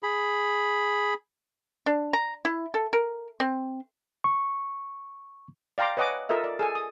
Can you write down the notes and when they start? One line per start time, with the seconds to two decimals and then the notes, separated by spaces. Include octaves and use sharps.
0.03 G#4 B5
1.86 D4
2.13 A#5
2.45 E4
2.74 A4
2.93 A#4
3.40 C4
4.24 C#6
5.78 D5 F5 G5 A#5 C6 D6
5.97 B4 C#5 D#5 F#5 G#5 D6
6.29 F4 A4 A#4 D#5 E5
6.44 D5
6.59 G#4 A4 G#5
6.75 D#6